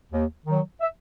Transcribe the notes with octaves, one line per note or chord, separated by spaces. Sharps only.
D#2
D#3 F#3
E5